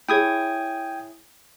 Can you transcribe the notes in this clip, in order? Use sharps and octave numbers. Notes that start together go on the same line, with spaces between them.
E4 G#4 C#5 G5 D#6 G#6